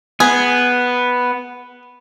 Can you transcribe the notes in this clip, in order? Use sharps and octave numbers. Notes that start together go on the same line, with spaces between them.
B3 G#4